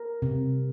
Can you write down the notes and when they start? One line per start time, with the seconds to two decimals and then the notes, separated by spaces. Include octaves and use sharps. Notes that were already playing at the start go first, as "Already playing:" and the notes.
Already playing: A#4
0.22 C3